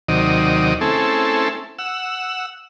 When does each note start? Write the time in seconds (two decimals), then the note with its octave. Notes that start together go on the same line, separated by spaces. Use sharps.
0.08 D#2 C3 D#3 F#3 D5 D#5
0.81 A3 C4 C#4 E4 G#4 A4
1.79 F#5 E6